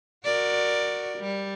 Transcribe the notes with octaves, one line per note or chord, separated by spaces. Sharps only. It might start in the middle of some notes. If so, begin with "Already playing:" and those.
F#4 A#4 D5
G3